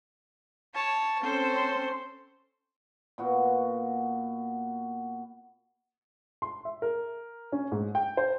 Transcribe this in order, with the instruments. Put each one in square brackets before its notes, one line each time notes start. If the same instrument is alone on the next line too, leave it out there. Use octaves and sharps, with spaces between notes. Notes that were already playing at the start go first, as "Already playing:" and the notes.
[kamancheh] C#5 A5
[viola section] C4 C#4 C6 [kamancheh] A4 C5
[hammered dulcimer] A#2 B3 F#4
[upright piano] C6
E5
A#4
C#4
G#2
G5
C5